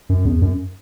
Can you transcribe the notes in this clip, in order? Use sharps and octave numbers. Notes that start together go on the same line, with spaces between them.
F#2
E2
F#2